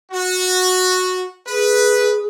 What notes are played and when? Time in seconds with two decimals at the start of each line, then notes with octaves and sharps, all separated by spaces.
0.12 F#4
1.48 G#4 B4